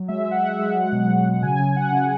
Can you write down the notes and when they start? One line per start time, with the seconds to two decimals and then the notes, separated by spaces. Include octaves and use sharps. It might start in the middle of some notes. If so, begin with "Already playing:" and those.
Already playing: F#3
0.08 G#3 E5
0.26 G#3
0.31 F#5
0.42 G#3
0.53 E5
0.59 G#3
0.75 F#3 F#5
0.92 B2
1.09 F#3
1.26 F#3
1.42 C#3 G#5
1.59 C#3
1.76 C#3 F#5
1.92 C#3